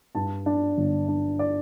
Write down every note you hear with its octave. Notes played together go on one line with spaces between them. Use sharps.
G2 A5
D4
G1
D4
D5